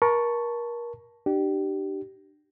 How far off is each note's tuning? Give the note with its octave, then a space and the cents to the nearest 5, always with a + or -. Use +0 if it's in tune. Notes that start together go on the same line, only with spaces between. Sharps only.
A#4 +30 A5 +0 C#6 +0
D4 +30 G4 -25